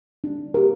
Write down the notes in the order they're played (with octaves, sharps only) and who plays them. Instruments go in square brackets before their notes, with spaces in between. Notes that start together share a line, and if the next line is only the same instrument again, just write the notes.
[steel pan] D4
G4 A#4